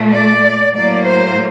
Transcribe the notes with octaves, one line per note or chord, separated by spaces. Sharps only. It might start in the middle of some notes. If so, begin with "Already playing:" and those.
Already playing: A#2 A3
D5
A2 F#3 A#3 D5
C5